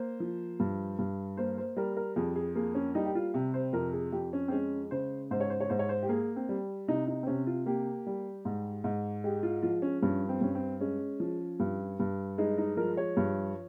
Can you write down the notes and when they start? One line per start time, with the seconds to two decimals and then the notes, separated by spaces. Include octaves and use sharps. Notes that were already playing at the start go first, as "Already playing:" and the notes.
Already playing: A#3 C5
0.20 F3
0.60 G2
0.99 G2
1.37 A#3 C5
1.58 C5
1.76 G3 A#4
1.97 A#4
2.16 F2 G#4
2.36 G#4
2.55 A#3 G#4
2.75 C#4
2.95 G3 D#4
3.05 G4
3.15 F4
3.34 C3 G4
3.54 C5
3.73 F2 A#4
3.93 G#4
4.12 F2 G4
4.33 C#4
4.48 C4
4.52 G#3 C#4
4.91 C#3 C5
5.31 G#2 C5
5.40 C#5
5.50 C5
5.60 C#5
5.69 G#2 C5
5.79 C#5
5.89 C5
6.03 G4
6.09 A#3 G#4
6.36 C4
6.49 G3
6.88 C3 D#4
7.08 D#4
7.23 C4
7.27 C3 C#4
7.47 F4
7.66 A#3 G4
8.07 G3
8.45 G#2
8.84 G#2
9.24 G#3 G4
9.43 F4
9.63 F3 F4
9.82 C#4
10.02 G2 C#4
10.29 C4
10.41 G2 C#4
10.55 C4
10.80 G#3 C#4
11.20 F3
11.60 G2
12.00 G2
12.38 G#3 D#4
12.58 D#4
12.77 F3 A#4
12.97 C#5
13.17 G2